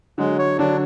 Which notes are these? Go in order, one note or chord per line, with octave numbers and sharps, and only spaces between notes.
D3 F#3 G#3
C#5
D3 F#3 D4